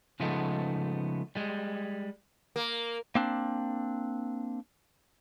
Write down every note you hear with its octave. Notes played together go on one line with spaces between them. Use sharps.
C#3 F3 G#3 A3 B3 D#4
G3 G#3
A#3
A#3 C4 D4